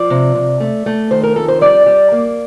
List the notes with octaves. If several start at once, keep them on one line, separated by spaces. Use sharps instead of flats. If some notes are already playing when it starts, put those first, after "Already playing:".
Already playing: F3 D5
C3
C3
A3
A3
D#3 C5
A#4
F2 A4
C5
G3 D5
G3
A#3